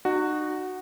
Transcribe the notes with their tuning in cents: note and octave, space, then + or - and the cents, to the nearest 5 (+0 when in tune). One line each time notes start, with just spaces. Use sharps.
D#4 -40 F#4 +0